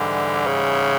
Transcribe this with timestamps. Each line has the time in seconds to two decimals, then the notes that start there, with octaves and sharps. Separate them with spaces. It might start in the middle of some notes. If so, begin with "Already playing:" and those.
Already playing: G#2 D3 E3 G3
0.47 C#3